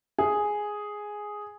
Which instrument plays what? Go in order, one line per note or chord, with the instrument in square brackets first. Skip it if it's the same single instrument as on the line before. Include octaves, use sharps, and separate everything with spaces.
[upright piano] G#4